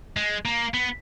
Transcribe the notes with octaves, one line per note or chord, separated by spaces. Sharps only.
G#3
A#3
B3